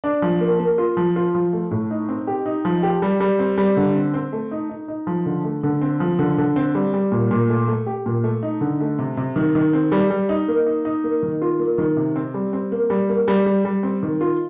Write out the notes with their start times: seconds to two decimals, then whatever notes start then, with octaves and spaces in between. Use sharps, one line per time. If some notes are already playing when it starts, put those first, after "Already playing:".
0.04 D4
0.22 F3
0.41 A#3
0.59 A#3
0.78 F4
0.97 F3
1.16 F4
1.35 F3
1.53 A3
1.71 A2
1.91 D#4
2.09 C4
2.27 G4
2.46 D#4
2.65 F3
2.83 G4
3.02 G3
3.20 G3
3.39 C4
3.58 G3
3.77 D3
3.95 C4
4.14 C4
4.33 A3
4.51 D#4
4.70 D#4
4.88 D#4
5.07 F3
5.26 D3
5.44 A3
5.63 D3
5.81 C4
6.00 F3
6.19 D3
6.38 D3
6.56 C4
6.75 G3
6.94 G3
7.12 A#2
7.31 A#2
7.49 A3
7.68 A3
7.86 G4
8.06 A#2
8.24 A3
8.43 D#4
8.61 D3
8.80 A3
8.99 C3
9.17 C3
9.36 D#3
9.55 D#3
9.73 C4
9.92 G3
10.10 G3
10.29 D#4
10.48 A#3
10.66 D#4
10.85 D#4
11.04 A#3
11.23 D#3
11.42 F4
11.60 A#3
11.78 D#3
11.97 C3
12.16 C4
12.34 G3
12.53 C4
12.72 A#3
12.90 G3
13.09 A#3
13.28 G3
13.46 G3
13.65 G3
13.83 C4
14.03 D#3
14.21 F4